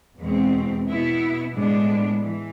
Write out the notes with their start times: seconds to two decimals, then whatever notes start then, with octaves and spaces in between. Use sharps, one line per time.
0.19 E2 B2 G#3 C4
0.86 B2 B3 E4
1.54 A2 G#3 B3 D4
2.22 E3